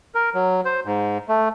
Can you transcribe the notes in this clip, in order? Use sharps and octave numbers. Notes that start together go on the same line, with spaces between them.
A#4
F#3
C5
G#2
A3